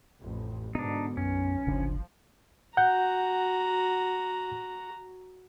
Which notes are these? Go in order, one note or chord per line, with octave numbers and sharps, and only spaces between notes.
A1 F2
G#2 B2 D3 B3 D4 D#4
B1 F#2 C#4
D1 G1 C#3 F3 D4
F#4 F#5 A#5 G6